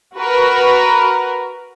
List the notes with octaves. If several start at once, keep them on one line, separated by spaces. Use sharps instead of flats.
F#4 A#4 B4